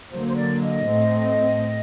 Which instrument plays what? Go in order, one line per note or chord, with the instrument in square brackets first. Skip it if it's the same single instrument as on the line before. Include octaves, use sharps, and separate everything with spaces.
[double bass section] D3 F#3 A#3 [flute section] C5
[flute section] C5
D5
D#5
[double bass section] A2 A3 C4